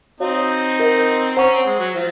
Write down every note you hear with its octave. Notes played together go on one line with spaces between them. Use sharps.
C4 D#4 F#4 C#5 F5
F4 A#4 D#5 F#5
C#4 C5 F#5 A#5 C#6
C4
G#3
F#3
F3 C5